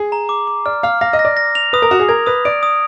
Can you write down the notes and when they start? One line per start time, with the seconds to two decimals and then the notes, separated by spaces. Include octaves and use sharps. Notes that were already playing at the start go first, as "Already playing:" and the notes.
Already playing: G#4
0.12 A#5
0.29 D6
0.47 D6
0.66 D5 F6
0.83 F5 F6
1.01 F5 A#6
1.13 D#5
1.19 A#6
1.25 D5
1.37 A#6
1.55 F7
1.73 B4 D#6
1.82 A#4
1.90 F#4 D#6
2.00 G#4
2.08 A#4 G#6
2.26 B4 D#6
2.45 D5 D7
2.63 D#6